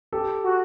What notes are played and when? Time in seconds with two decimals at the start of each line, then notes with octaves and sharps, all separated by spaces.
0.13 G4 A4
0.44 F#4